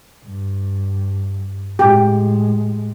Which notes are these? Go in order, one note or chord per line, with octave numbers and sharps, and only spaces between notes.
G2
A2 G#3 G4